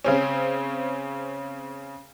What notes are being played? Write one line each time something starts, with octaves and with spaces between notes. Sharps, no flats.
C#3 C4 C#4